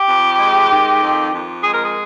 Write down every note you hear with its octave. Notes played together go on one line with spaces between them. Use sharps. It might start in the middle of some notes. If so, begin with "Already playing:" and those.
Already playing: G4
F2
G#3
D#3
F2
F2
G#3 G#4
A#4
G#4